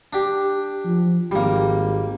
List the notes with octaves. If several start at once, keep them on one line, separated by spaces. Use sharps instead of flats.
D4 G4
F3
G#1 G3 A#3